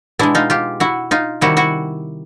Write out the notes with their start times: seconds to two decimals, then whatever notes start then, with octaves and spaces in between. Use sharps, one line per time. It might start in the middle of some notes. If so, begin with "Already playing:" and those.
0.19 B2 G#3 D4 E4
0.35 D#4 F4
0.50 F4 G4
0.80 E4 F#4
1.11 D#4 F4
1.41 C3 D#3 G3 E4 F#4
1.57 E4 F#4